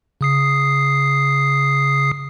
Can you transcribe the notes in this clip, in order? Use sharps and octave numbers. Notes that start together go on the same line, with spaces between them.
C#3 D#6 C7